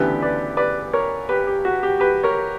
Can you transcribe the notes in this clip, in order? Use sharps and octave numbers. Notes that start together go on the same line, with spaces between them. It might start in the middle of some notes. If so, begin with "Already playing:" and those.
Already playing: D2 C#3 E3 B3 D4 G4 B4
B4 D5
B4 D5
A#4 C#5
G4 B4
G4
F#4
G4
G4 B4
A#4 C#5